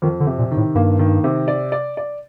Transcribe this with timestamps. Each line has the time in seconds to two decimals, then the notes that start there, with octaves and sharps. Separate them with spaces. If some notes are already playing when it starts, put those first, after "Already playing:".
0.02 F2 D#3
0.20 D3
0.27 C3
0.38 A#2
0.51 D#3
0.57 A2
0.75 G2 A#3
0.99 D#3
1.24 C3
1.48 D5
1.72 D5
1.97 D5